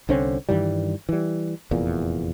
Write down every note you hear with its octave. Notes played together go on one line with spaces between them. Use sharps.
C2 D3 C4 C#4
G2 D#3 E3 G3
E3 G3
F1 E2 A#2